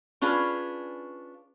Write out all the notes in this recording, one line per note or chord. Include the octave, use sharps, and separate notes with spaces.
C#4 D4 F4 G#4 B4